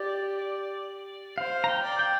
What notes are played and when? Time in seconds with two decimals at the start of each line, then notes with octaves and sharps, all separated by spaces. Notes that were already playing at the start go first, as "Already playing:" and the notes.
Already playing: G4 D5
1.38 C5 F5
1.64 A#5
1.69 G5
1.83 D5
1.99 G5